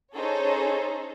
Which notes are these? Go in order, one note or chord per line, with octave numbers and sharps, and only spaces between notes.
C#4 D#4 G#4 A4 C5 C#5